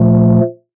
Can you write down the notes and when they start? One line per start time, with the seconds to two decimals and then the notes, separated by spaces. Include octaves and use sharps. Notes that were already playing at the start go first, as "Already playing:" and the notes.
Already playing: A#2 F3 A3